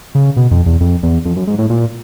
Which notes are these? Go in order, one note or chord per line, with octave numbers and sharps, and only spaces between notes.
C#3
B2
F2
E2
F2
E2
F2
F#2
G#2
A2
A#2